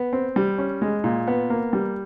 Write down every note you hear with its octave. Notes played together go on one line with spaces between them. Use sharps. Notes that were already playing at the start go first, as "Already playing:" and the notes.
Already playing: B3
C4
G3
C#4
G#3
A#2
B3
A#3
G3